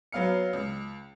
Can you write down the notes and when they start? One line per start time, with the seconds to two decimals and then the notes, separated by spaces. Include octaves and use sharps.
0.12 F#3 B3 F5 F6 C#7
0.53 C#2